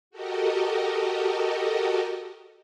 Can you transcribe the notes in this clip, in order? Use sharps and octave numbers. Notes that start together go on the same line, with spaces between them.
F#4 G4 A4 A#4 D#5